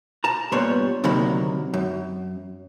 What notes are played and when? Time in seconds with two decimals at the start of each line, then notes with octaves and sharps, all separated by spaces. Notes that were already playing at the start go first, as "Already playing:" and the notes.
0.24 A5 A#5
0.52 G2 A#2 G3 B3 C#5 C6
1.04 D2 C3 D#3 F#3 A#3 B5
1.74 F#2